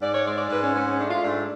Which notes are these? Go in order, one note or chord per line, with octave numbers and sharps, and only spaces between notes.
G#2 D5
C#5
G#3 D5
D5
G#2 B4
C#4
G#3 C#4
C#4
A3 D4
F4
G#2 D4